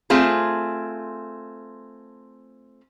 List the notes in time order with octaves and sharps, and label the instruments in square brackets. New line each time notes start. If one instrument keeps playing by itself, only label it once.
[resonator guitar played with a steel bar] A3 C4 F4 G#4